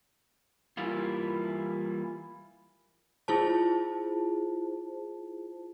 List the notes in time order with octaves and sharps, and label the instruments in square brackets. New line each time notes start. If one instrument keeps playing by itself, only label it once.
[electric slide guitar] E3 G3 A#3 E4 F4
[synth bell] E4 F4 G#4 C5 A5